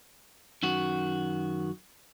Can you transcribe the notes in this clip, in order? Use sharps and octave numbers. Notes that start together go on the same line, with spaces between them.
F#2 D#3 F#4